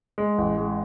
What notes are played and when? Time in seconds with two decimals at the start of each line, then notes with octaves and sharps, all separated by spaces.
0.18 G#3
0.38 A1
0.58 G#3